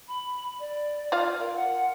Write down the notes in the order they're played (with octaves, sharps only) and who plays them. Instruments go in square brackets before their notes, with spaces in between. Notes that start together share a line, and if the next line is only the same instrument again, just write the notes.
[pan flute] B5
D5
[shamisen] F4 F5
[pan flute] A#4
F#5